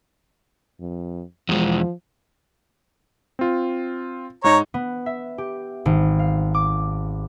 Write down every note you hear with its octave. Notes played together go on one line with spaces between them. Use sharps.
F2
E2 F3 G#3
C4 F4
G#2 D#4 C#5 A#5
B3
E5
G4
G#1
F5
D6